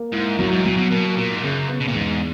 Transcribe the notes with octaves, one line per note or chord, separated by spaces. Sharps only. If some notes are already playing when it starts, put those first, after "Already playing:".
Already playing: A#3
G#2 E4
F#2 F#3
G#2
A#2 F#3
B2
B2 A#3
A#2 A#3
G#2
F#2 C#3
B3
B2
A#2
E2 G#2